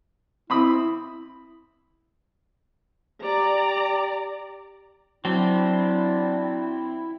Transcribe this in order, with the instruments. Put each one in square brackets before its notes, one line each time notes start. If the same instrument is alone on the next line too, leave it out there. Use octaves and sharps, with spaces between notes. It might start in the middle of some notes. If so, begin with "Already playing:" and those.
[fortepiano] C4 B5 D#6 [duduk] E4
[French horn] G4 [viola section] D5 A#5
[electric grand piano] F#3 [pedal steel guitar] C4 [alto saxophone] D4 [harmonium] E4